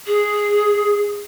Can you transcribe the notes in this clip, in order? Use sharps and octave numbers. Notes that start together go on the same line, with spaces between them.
G#4